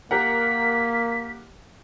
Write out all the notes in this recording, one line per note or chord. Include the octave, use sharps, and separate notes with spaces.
A#3 G4 A#4 F#5 B6